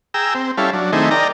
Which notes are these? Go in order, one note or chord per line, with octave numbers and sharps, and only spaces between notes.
G#4 G5 A#5 E6
C4
G3 C#4 E4 A4 F5
F#3 D4
D#3 A3 C4 D#4 E4 G#4
A#4 D5 D#5 G5 A#5